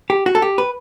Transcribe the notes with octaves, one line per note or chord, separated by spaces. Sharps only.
G4
F#4
A4
G4
B4